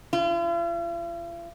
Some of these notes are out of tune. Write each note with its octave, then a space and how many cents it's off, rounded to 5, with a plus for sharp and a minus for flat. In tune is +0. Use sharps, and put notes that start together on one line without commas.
F4 -45